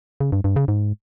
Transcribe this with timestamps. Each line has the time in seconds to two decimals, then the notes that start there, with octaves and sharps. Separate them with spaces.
0.20 C#3
0.32 G2
0.44 G2
0.56 C#3
0.68 G#2